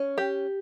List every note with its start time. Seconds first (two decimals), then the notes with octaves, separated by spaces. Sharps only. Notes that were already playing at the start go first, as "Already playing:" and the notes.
Already playing: C#4
0.18 G4